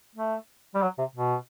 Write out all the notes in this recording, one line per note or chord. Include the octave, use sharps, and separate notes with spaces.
A3
G3
F#3
C3
B2